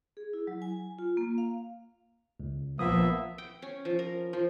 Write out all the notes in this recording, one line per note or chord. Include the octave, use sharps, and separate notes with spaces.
G#4
E4
F#3
G#5
F4
A#3
F5
C#2
A#1 F3 A#3 B3 E5 D#6
G5
C#4
F3
A#4
F3